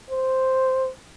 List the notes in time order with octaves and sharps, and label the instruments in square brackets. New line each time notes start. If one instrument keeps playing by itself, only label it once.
[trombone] C5